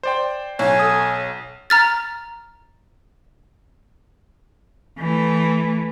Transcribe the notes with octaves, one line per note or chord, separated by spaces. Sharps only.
C5 D5 G5
B1 C#5 G#5
A4 D#6
A#5 F6 A6
E3 A3